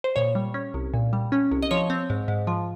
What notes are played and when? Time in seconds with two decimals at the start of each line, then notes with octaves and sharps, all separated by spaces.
0.04 C5
0.16 A#2 C#5
0.35 G3
0.54 C#4
0.74 C2
0.94 A#2
1.13 G3
1.32 C#4
1.51 C2
1.62 D#5
1.71 F3 C#5
1.90 C4
2.10 G#2
2.28 G#2
2.47 F3